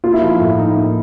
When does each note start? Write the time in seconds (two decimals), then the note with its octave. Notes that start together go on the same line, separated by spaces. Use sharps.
0.04 A#3 F4
0.13 E4
0.22 F3 F4
0.40 A2
0.58 D#4
0.76 A#3